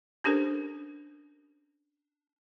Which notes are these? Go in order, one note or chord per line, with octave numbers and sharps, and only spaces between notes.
C#4 D4 G4 A4 A#4 C5